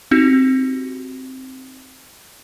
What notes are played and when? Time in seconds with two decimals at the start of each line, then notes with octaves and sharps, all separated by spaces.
0.11 C4 D#4 F#4 G4